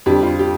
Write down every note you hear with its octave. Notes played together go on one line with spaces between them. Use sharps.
F2 D3 G3 G4
F4
G4